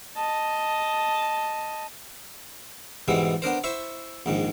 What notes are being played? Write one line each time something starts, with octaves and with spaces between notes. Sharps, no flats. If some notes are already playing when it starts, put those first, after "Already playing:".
D#5 A5
G#2 B2 E3 G3 G#3 E4
B3 D4 A#4 C5
E4 C5 E5 C#6
A#1 G#2 D#3